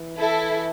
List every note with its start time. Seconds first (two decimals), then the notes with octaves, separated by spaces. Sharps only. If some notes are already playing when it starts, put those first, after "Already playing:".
Already playing: E3
0.18 E4 A4